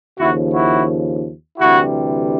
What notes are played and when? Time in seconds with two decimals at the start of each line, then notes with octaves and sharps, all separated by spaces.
0.19 D#2 C#3 F3 E4 F#4
0.53 E4 F#4
1.58 D2 C3 E3 G3 E4 F#4